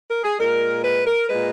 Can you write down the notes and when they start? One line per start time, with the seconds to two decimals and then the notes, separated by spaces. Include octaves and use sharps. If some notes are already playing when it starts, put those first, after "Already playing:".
0.09 A#4
0.24 G#4
0.39 A#2 G#3 A#4
0.84 B4
1.06 A#4
1.29 A#2 G#3 B4